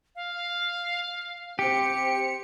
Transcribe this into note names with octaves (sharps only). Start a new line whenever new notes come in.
F5
C4 G4 C5 C#7